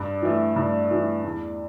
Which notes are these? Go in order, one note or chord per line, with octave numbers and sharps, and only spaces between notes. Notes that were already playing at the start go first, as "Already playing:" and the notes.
Already playing: G2
E3 A3
G2
E3 A3
E2